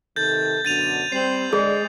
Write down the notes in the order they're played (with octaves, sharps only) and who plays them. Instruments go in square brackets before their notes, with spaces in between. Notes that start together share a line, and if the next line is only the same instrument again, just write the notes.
[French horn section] C3 D#3 A4 [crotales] G6 A6
[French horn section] F#2 B2 D3 [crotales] A6 D#7 F7
[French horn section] G3 C4 [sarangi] C5 [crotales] C7 F#7
[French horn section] D3 D5 [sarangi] G#3 [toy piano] G#4